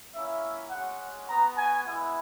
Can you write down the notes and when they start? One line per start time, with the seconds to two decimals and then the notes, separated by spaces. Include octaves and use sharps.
0.14 A#3 C#4 E4 E5
0.71 G#3 C#4 F#4 F#5
1.28 B3 F#4 A#5
1.57 G#5
1.86 G#3 B3 E4